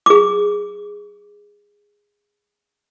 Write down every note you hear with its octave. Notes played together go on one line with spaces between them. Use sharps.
G#4 D6